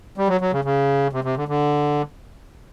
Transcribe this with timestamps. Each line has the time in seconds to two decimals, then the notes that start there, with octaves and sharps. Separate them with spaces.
0.18 G3
0.28 F#3
0.41 F#3
0.53 C#3
0.65 C#3
1.13 C3
1.24 C3
1.37 D3
1.48 D3